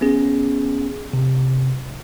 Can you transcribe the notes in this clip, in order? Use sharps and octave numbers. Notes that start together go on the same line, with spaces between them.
B3 C#4 G#4
C3